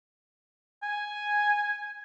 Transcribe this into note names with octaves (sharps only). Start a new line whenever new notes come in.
G#5